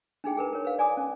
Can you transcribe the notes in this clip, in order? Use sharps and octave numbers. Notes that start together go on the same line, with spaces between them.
D4 D#4 G#4 G5
G#4 A#4 B4 A#5
A#4 C#5
B4 F5
D5 G#5 A#5 D6 D#6
C#4